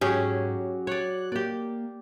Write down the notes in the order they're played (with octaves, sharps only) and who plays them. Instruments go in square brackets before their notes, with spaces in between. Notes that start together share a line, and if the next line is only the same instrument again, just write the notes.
[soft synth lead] G#2 [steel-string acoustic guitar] F#3 [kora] C#4 G4 G#4
[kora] C#5 D5 [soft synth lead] F#6
[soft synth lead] A#3 [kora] G4 D5